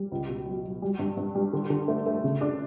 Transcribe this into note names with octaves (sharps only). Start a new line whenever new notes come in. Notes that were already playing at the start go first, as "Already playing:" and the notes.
Already playing: G3
C#2
B2
F#3
F#3
G3
G2
G2
G3
D3
D3
A3
A3
C#3
D4